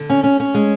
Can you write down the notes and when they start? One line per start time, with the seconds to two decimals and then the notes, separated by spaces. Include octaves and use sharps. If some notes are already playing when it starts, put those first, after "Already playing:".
Already playing: D3
0.10 C#4
0.23 C#4
0.40 C#4
0.54 G#3